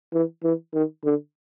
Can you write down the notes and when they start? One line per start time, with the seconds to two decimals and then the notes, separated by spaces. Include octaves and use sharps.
0.14 E3
0.44 E3
0.74 D#3
1.04 D3